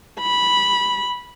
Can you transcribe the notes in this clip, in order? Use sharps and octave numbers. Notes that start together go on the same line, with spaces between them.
B5